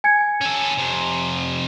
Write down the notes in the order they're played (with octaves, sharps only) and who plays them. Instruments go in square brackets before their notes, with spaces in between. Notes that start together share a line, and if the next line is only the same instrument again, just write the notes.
[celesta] G#5 G#6 C#7
[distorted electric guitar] C#4 A4
F2 C3